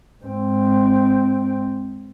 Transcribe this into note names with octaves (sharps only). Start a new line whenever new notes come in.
G#2 C4